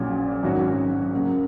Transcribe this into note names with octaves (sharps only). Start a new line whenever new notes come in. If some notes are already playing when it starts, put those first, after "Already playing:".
Already playing: A#1 A#2 F#3 C#4 G#4
G#1 G#2 F#3 C#4 F#4
C#3 F#3 A#3